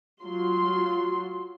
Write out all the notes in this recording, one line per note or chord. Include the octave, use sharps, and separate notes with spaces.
F#3 F4 F#4 C6